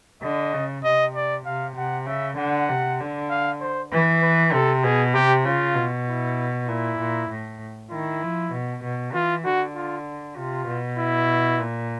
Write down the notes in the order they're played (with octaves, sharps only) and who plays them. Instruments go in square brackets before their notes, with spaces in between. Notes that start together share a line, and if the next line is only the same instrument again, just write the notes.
[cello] D3 [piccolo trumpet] D#5
[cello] C#3
[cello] C3 [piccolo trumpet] D#5
[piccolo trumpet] D5
[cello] C3 [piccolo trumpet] F5
[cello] C3 [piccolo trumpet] F#5
[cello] C#3 [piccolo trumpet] E5
[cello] D3 [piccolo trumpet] F#5
[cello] C3
D3
[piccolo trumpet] F5
C5
[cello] E3 [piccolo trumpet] B4
[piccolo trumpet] B4
[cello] C3 [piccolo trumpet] A4
[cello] B2 [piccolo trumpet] G#4
[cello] C3 [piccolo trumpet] G4
[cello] C#3 [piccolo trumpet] F4
[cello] B2
[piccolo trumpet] E4
[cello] A#2 [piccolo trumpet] E4
[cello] A#2
A2
[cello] D#3 [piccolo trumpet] E4
[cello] F3
B2
B2
[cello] E3 [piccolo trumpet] F4
[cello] D3 [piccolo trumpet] F#4
[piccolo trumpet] F4
[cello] C3 [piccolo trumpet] F4
[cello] B2
[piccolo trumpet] E4
[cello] A#2